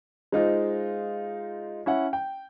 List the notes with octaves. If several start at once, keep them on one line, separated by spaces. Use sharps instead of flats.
G#3 D#4 F4 C5
C#4 E4 E5 F#5
G5